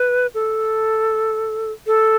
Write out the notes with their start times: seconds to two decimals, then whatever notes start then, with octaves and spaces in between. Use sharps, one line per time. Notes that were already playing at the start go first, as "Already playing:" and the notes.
Already playing: B4
0.34 A4
1.87 A4